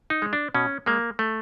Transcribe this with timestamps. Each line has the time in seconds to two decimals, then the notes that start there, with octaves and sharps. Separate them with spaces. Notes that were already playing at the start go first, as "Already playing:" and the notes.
0.10 D#4
0.22 G#3
0.33 D4
0.54 B2 C#4
0.86 G#3 A#3
1.19 A3